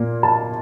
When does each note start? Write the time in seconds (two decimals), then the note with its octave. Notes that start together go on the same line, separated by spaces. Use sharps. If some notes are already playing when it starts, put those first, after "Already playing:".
Already playing: A#2 A#3
0.23 A5